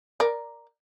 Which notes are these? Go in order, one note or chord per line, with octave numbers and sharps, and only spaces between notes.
A#4 D5